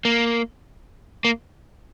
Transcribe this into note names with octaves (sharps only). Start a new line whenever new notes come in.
A#3
A#3